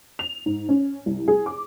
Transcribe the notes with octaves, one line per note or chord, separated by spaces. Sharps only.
F7
G#2
C#4
C2
G#4
D6